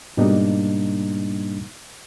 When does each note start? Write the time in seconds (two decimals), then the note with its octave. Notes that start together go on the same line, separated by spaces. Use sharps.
0.17 G#2 B2 G3 A#3 D4 D#4